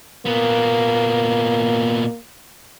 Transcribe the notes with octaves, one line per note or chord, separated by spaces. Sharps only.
A#2 A#3 B3